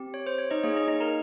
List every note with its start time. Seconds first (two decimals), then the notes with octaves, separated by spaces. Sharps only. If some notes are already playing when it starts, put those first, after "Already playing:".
Already playing: C4 G4
0.14 C#5
0.27 C5
0.38 C#5
0.51 D#4 D#5
0.63 A#3 D#4 G#4 C#5
0.75 D#4 D#5
0.88 D#4 D#5
1.00 A#4 A#5